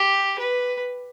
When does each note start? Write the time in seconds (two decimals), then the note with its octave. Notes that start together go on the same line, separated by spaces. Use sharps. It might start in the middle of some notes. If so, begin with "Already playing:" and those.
Already playing: G4
0.39 B4